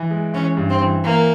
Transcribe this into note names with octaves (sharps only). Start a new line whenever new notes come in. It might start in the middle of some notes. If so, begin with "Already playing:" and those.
Already playing: E3
G#3
E3 C#4
G2
C4
E3
E3 A#3